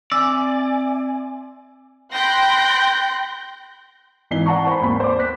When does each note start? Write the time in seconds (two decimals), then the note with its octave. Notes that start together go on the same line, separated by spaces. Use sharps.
0.12 C4 D5 E5 G#5 E6
2.13 G5 B5 C6 F#6 G6 A#6
4.31 G#1 E3 D#4 C7 G7
4.46 D5 F#5 A5 A#5 C#6
4.67 C5 F#5 G#5 B5
4.81 G#1 D#2 B5
5.00 C5 D5 D6
5.19 F#6 B6